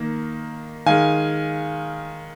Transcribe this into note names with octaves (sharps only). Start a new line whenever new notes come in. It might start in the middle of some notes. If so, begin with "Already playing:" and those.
Already playing: D#3 A#3
D#3 G#3 F5 G#5